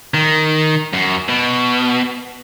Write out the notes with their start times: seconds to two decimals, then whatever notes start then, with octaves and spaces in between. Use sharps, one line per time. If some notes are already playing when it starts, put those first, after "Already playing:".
0.14 D#3
0.93 F#2
1.28 B2